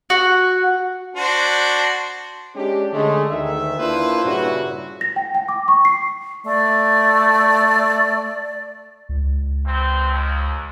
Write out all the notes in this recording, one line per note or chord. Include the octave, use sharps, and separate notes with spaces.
F#4
D4 F#4 C5
G#3 C#4 D4 G4
D3 G#3 A3
D2 D#3 E5
A#3 D4 E4 F4 B4 C5
G2 A#2 C#3 E4 F#4
A#6
G5
G5
D6
C#6
C7
A3 D5
C#2
G2 C4
D#2